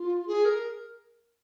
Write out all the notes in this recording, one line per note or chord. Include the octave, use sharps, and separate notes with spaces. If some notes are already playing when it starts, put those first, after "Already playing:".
Already playing: F4
G#4
A#4